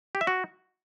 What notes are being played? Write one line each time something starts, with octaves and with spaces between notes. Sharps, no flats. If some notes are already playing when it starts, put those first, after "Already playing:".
G4
E5
F#4